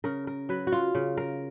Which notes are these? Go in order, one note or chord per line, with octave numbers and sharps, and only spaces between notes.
C#3 A#4
A#4
F#3 B4
F#4
F4
C#3
A#4